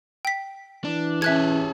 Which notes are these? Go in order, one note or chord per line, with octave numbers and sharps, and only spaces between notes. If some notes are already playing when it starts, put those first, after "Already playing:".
G5 B6
E3 D4
C#4 G#4 A4 E5 F#6 G#6